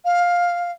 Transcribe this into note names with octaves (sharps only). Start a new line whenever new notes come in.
F5